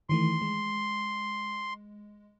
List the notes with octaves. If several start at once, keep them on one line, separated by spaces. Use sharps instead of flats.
D#3 E3 A3 C6
G#3